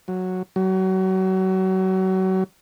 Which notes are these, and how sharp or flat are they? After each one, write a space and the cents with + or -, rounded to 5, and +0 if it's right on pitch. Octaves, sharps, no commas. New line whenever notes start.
F#3 -5
F#3 +30